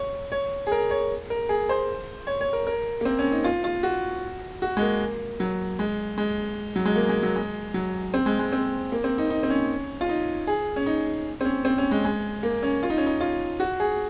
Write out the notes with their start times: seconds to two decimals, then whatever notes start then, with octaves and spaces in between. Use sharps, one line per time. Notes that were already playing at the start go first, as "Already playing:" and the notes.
Already playing: C#5
0.32 C#5
0.67 G#4
0.72 A#4
0.91 C#5
1.30 A#4
1.49 G#4
1.69 C5
2.27 C#5
2.41 C#5
2.53 A#4
2.67 A#4
3.01 A#3
3.05 C4
3.19 C#4
3.32 D#4
3.44 F4
3.64 F4
3.83 F#4
4.62 F#4
4.77 G#3
4.81 A#3
5.40 F#3
5.79 G#3
6.18 G#3
6.76 F#3
6.85 G#3
6.96 A#3
7.09 G#3
7.23 F#3
7.36 G#3
7.74 F#3
8.14 C4
8.26 G#3
8.39 G#3
8.53 C4
8.92 A#3
9.04 C4
9.18 D#4
9.30 D#4
9.43 C4
9.50 C#4
10.01 F4
10.09 D#4
10.47 G#4
10.76 C#4
10.86 D#4
11.41 C4
11.45 C#4
11.65 C4
11.78 C#4
11.91 G#3
12.05 G#3
12.43 A#3
12.63 C#4
12.83 F4
12.90 D#4
12.98 C#4
13.06 D#4
13.21 F4
13.60 F#4
13.80 G#4